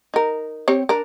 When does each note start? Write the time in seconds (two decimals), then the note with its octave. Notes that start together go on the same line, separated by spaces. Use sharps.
0.14 D#4 A#4
0.68 C4 G4 C#5
0.89 D4 A#4